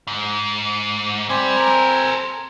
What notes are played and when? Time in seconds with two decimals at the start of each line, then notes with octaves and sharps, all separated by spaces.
0.07 G#2
1.29 G3 C4 G#5
1.57 A4 A#4